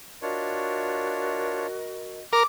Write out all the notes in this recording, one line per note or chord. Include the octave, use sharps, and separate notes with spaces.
D4 F4 F#4 A#4 C#5 D#5
A#4 D6